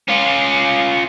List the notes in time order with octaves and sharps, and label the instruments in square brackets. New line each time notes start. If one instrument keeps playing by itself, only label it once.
[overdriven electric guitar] C#4 F4